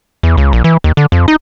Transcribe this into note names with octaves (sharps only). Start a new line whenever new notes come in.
E2
C#2
A#1
E3
D#2
D3
F2
D#4